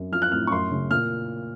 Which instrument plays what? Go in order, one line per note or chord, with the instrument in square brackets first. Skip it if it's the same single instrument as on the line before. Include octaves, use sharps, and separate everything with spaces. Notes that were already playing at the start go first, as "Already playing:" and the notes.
Already playing: [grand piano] F#2
F3 F6
F#6
A2 F6
C#6
F#2 C6
C#3
A#2 F6